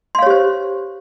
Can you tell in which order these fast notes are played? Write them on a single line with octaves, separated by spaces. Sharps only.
C6 F5 C#5 G4 C5